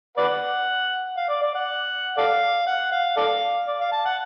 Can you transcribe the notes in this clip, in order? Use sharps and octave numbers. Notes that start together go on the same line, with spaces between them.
B4 D5 F#5
F5
D5
D5
F#5
A4 D5 F5
F#5
F5
A4 D5 F5
D5
F5
A5
F#5